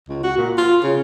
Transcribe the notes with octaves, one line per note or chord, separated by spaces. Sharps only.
C#2
F#4
A#2
F4
C#3